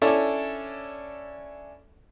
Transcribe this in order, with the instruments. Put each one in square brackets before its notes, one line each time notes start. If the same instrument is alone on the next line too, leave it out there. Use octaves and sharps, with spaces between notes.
[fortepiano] C#4 D4 E4 A4 C#5